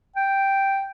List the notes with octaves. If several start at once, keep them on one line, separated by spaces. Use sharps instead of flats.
G5